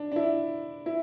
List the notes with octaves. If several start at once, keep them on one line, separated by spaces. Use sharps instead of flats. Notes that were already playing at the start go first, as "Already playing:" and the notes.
Already playing: D4
D4
E4
E4